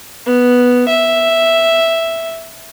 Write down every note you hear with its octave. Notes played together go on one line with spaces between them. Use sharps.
B3
E5